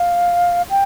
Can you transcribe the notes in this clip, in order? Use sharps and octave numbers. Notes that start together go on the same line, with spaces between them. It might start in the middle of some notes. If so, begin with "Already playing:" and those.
Already playing: F5
G5